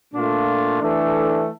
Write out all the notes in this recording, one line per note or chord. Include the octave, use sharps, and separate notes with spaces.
A#2 A3 D4 F4
E3 A3 D4 A4